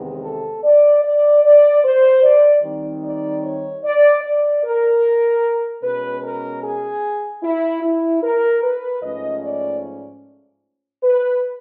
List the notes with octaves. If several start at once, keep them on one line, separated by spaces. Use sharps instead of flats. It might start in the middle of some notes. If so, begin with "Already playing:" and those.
Already playing: E2 C3 D#3 G#3 B3
A4
D5
D5
D5
C5
D5
D#3 G3 C4 D#4
D5
C#5
D5
D5
A#4
B2 G#3 C#4 B4
A#4
G#4
E4
E4
A#4
B4
G#2 F3 A3 C#4 D#5
D5
B4